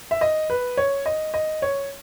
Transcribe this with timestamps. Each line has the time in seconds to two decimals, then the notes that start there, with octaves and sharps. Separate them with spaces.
0.11 E5
0.21 D#5
0.50 B4
0.77 C#5
1.06 D#5
1.34 D#5
1.62 C#5